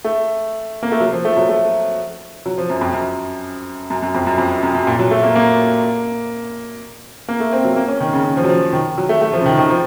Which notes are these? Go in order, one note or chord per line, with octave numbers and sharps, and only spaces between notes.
A3
A#3
A3
F#3
F3
A3
F#3
A3
F#3
F3
F#2
F2
F#2
F#2
F#2
F2
F#2
F2
F#2
F#2
F#2
A#2
F#3
A3
A#3
A#3
A#3
A3
C4
F#3
A#3
C#4
D#3
C#3
C#3
F3
F#3
F3
D#3
F#3
A3
A3
F3
C#3
D#3
D#3
F3